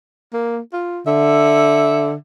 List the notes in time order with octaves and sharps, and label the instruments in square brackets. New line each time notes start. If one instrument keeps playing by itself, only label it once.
[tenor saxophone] A#3
F4
[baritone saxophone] D3 [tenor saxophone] E5